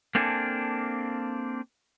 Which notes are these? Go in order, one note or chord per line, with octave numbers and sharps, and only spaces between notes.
A#3 C4 D4 A4 G#5